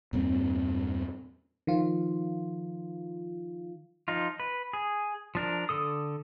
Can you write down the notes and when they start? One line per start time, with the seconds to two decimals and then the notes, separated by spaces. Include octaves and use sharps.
0.13 E2 G2 A#2 C4
1.67 D#3 F3 F4
4.08 F3 D#4 F4
4.40 B4
4.73 G#4
5.35 F3 D4 A#4
5.69 D3 A4 D#6